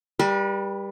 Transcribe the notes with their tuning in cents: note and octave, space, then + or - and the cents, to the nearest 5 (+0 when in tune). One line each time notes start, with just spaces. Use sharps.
G3 +15 B4 -40